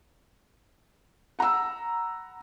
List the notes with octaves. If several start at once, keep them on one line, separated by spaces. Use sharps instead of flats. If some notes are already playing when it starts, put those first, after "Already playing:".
F#5 A#5 B5 E6